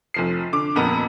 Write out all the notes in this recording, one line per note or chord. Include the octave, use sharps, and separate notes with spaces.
F1 F3 C7
D3 D6
D#1 F2 B3 A#4